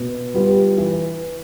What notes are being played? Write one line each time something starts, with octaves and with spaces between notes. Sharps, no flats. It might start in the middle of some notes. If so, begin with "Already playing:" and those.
Already playing: B2
G3 B3 F4
E3